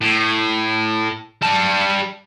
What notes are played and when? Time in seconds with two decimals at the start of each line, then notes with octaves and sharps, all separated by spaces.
0.01 A2
1.42 G3 A5